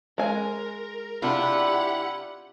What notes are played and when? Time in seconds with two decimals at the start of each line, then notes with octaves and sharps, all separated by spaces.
0.18 G#3 A#4 G#5
1.22 C3 D4 E4 F4 G4 F#5